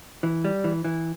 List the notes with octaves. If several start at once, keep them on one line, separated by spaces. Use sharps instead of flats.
E3
G3
E3
E3